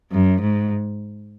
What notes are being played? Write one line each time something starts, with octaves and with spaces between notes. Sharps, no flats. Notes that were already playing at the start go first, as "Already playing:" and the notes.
F#2
G#2